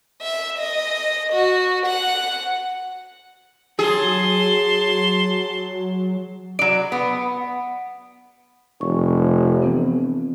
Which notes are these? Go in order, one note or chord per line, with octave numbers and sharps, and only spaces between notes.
E5
D#5
F#4
F#5
F#3 G#4 A5 C6
F#3 D5 D7
B3 F#5
F1 C#6
E3 B3 C4